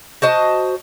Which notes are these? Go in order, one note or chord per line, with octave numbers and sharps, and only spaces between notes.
F#4 C5 D#5 A5